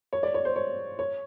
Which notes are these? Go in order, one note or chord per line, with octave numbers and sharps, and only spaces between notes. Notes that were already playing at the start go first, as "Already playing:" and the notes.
C#5
D5
C#5
C5
C#5
C#5